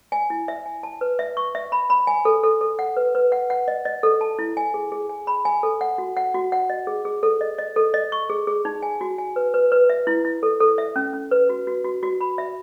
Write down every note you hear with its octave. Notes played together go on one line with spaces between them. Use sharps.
G#5
E4
E5
G#5
A5
B4
E5
C#6
E5
B5
B5
G#5
A4
A4
A4
F#5
B4
B4
F#5
F#5
D#5
D#5
A4
A5
E4
G#5
G#4
G#4
G#5
B5
G#5
A4
F#5
F#4
F#5
F#4
F#5
D#5
G#4
G#4
A4
D#5
D#5
A4
D#5
C#6
G#4
G#4
D#4
G#5
F#4
G#5
B4
B4
B4
E5
E4
E4
A4
A4
E5
C#4
C#4
B4
F#4
F#4
F#4
F#4
B5
E5